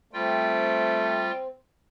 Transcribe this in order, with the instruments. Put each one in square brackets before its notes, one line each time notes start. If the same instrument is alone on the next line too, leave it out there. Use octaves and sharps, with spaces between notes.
[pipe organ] G3 F4 G5 [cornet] A3 [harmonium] C4